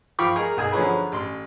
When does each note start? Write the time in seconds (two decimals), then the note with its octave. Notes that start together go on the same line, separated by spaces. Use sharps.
0.19 F3 F4 G5 B5 C#6 D6
0.35 D#4 G#4 A#4
0.57 B1 G#4 G#5
0.72 D3 F3 F#3 C#4 G#4 B4
1.12 A1 C6